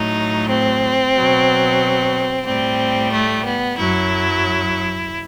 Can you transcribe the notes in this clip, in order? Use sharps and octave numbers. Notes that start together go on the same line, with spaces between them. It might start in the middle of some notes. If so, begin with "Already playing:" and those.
Already playing: A2 F#3 D#4
C4
B2 F#3
A2 G3 C4
A3
B3
F#2 F#3 E4